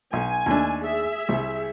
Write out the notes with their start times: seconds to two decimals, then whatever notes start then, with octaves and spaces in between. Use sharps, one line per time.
0.13 B1 G#5
0.46 D#2 A3 D4
0.82 G#4 E5
1.29 C2